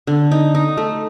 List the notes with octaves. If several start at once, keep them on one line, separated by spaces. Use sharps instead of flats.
D3
D#4
D#4
A3